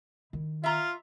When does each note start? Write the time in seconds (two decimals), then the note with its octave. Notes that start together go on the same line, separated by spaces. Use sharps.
0.33 D#3 E4
0.64 F4 E5 A#5